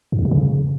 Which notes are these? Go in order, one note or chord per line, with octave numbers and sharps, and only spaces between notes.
G2
E2
B2
C#3